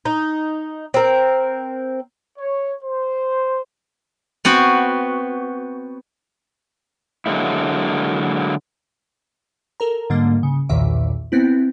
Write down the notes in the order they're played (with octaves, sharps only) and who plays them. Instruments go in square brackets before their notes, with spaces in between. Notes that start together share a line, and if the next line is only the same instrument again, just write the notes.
[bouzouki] D#4
C4 A#4
[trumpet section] C#5
C5
[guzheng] B3 C4 F#4
[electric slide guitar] D3 F#3 G#3 A#3 E4
[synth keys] A4 A#4 A#5
G#2 D3 G3 A#3
C#3
B1 E2 A#2 D#3 E5 D6
B3 C4 E4